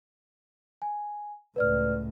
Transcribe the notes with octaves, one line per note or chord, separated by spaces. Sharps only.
G#5
C#2 A2 B4 D5 F6